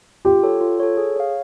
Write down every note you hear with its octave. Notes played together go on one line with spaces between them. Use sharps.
F4 G4
A4 C#5
F4
A4 C#5
G#4
C#5 F5